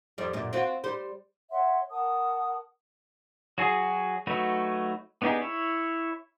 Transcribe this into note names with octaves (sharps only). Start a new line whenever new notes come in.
F2 G3
F#2 A#2
C4 F4 F#4
G3 C5
C#5 E5 F#5 C6
A#4 F#5 A5 D#6
F#3 F#4 G#4
F#3 A3 D#4 F#4 B4
B3 D4 D#4 G4 G#4
E4 C#5